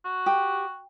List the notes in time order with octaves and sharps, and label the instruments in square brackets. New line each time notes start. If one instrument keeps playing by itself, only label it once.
[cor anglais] F#4
[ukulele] G4